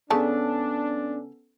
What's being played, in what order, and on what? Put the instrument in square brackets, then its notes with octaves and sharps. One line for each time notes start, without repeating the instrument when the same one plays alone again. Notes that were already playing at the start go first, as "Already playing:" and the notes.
[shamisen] C#3 A5 [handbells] B3 C#4 A4 [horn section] D4